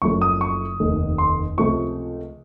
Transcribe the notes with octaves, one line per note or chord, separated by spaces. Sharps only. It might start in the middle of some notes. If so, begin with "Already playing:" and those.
F#1 F#2 F3 A3 C#6
D#6
C#6
F1 D#2 D#3 A3
C6
C#2 C3 F3 A3 C#6